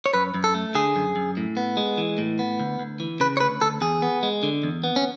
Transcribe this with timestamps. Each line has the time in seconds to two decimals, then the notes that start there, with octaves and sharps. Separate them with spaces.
0.06 C#5
0.13 F#2 B4
0.34 F#2
0.44 A4
0.54 A3
0.75 D3 G#4
0.96 F#2
1.16 F#2
1.37 A2
1.57 B3
1.77 G#3
1.98 E3
2.18 A2
2.39 B3
2.60 D2
2.79 D2
3.00 E3
3.20 C#3 B4
3.37 C#5
3.40 D2 B4
3.61 D2 A4
3.81 E2 G#4
4.02 B3
4.23 G#3
4.43 D3
4.64 E2
4.84 B3
4.96 C#4